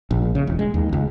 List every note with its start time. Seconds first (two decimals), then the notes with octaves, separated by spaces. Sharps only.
0.11 A#1
0.35 C#3
0.47 E1
0.59 G#3
0.74 D#2
0.93 C#2